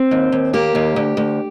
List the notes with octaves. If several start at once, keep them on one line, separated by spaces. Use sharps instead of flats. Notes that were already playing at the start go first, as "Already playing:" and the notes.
Already playing: C4
D#2
D#2
A#3 G4
D#2
D2
D2